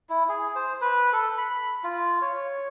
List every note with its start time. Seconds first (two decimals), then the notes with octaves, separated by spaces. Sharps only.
0.09 E4
0.29 G#4
0.56 C5
0.81 B4
1.13 A4
1.38 B5
1.84 F4
2.22 C#5